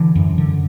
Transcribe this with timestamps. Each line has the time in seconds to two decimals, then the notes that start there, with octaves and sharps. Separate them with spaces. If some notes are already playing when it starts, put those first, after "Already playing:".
Already playing: D3 E3
0.15 F#2
0.38 D3